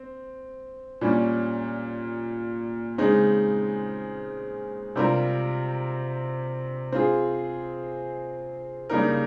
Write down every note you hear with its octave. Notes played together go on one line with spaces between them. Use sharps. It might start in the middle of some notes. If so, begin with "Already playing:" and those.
Already playing: C4
A#2 G3 C#4
C#3 G#3 C4 D#4
C3 G3 C4 F4 A#4
C4 F4 G#4
C#3 G3 A#3 D#4 A#4